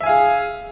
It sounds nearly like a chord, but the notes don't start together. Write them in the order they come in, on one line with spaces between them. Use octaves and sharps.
E5 G#5 F5 G#4